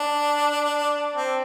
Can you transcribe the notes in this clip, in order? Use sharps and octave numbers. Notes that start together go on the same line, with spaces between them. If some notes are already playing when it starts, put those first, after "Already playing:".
Already playing: D4
C4